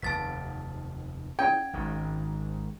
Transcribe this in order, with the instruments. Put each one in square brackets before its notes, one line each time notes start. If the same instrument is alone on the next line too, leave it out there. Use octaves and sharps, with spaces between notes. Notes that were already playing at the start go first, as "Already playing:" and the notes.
[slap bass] F1 D#2 [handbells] A5 A6 B6
[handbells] C#4 G#6 [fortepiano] G5
[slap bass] G#1 G#2 D#3